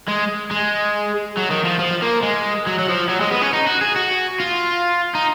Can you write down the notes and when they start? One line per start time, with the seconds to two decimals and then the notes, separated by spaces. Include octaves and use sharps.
0.08 G#3
0.51 G#3
1.37 F#3
1.51 D#3
1.65 F3
1.80 F3
2.02 A#3
2.23 G#3
2.67 F#3
2.79 F#3
2.89 F3
3.09 F#3
3.21 G#3
3.31 B3
3.42 C#4
3.53 D#4
3.67 F#4
3.81 G#4
3.96 F#4
4.40 F4
5.15 D#4